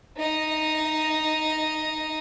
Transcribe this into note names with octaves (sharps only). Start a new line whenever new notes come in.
D#4 D#5